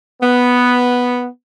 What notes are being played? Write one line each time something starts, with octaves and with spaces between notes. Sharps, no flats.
B3